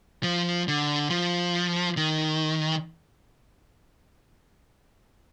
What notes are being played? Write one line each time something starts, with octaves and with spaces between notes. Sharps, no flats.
F3
D3
F3
D#3